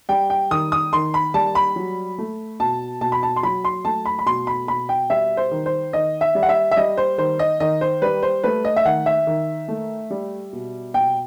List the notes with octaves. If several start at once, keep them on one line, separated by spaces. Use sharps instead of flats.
G3 G5
G5
D#3 D#6
D#6
D#3 C6
B5
G3 A5
B5
F#3
A3
B2 A5
B2 A5
B5
A5
C6
F#3 B5
C6
A3 A5
B5
B5
B2 C6
B5
B2 B5
G5
G3 E5
C5
D#3
C5
D#3 D#5
E5
G3
F#5
E5
E5
G3 D#5
C5
D#3 C5
D#5
D#3 D#5
C5
G3 B4
C5
A3 B4
D#5
E5
D#3 F#5
E5
D#3
A3
G3
B2
B2 G5